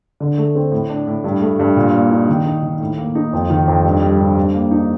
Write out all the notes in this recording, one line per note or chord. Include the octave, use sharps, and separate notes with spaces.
D3
A3
C4
A2
D4
A2
G2
A3
G2
A#2
A#3
D#4
D#3
D#4
D#3
A2
A#3
D#4
F2
D#3
F2
G2
G3
G2
G2
A#3
D#4